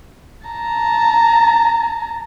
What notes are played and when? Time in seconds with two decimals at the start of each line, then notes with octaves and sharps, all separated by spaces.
0.48 A5 A#5